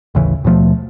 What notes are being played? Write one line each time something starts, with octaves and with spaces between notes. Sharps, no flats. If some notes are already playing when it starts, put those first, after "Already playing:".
A1 D#2 C#3 E3
D#2 B2 F3 A3